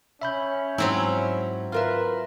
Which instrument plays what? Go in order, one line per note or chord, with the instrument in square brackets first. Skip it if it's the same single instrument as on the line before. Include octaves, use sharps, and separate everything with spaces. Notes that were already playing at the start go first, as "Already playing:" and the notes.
[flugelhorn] C#4 [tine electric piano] E5 B5 G6
[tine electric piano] G#2 [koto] F#3 C4 E4
[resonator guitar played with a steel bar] F4 A#4 E5 [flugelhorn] B4